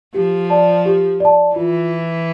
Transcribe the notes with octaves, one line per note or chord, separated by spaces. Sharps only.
F3 G4
D5 A5
G4
D5 A5
E3 F4